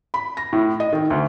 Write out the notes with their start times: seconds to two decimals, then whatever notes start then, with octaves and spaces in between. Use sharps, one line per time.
0.14 B5
0.37 A#6
0.53 A2
0.80 D#5
0.93 D#3
1.10 D2